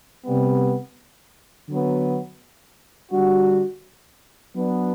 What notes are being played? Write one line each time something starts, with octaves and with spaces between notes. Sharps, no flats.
C3 G3 B3
D3 F#3 B3
D3 G3 D4 F#4
F#3 B3 D4